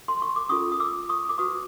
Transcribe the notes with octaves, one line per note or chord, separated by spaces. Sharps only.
C6
C#6
D6
C#4 F4 A4 C#6 D#6
D#6
D6 E6
C#6 D#6
D6
F#4 B4 C#6 D#6